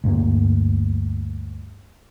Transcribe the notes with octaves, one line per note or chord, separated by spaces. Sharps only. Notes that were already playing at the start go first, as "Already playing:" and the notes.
D2 G2 A#3